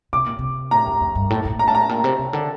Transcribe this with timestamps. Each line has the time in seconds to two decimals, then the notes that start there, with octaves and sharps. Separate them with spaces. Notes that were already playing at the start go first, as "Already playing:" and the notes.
0.13 C3 D6
0.26 A#2
0.39 C3
0.71 A2 A#5
0.87 F2
1.01 F2
1.15 G2
1.30 A2
1.45 A2
1.50 A#2
1.59 A#5
1.68 A2 A5
1.75 A#5
1.89 A#2
2.04 C3
2.19 C3
2.33 D3